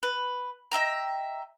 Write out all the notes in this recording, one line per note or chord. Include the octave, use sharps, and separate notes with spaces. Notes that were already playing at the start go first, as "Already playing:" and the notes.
B4
D#5 E5 G5 A#5